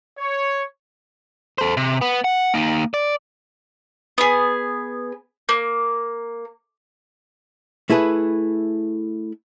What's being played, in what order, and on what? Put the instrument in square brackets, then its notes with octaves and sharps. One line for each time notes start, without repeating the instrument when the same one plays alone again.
[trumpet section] C#5
[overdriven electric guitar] A4 C5
C3
B3
F#5
A#3 D#4
D5
[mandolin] B3 G#4
A#3
[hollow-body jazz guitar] A3 E4 G#4 B4